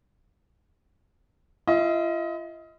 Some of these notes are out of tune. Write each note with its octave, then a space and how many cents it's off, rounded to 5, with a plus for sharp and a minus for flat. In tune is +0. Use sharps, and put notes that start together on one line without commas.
F4 -40 D#5 +30